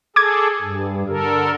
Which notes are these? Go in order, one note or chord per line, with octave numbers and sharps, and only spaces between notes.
G#4 A4 D6 G#6
G2
D3 A4 A#4